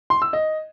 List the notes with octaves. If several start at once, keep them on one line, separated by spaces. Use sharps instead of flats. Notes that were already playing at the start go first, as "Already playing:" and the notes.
C6
E6
D#5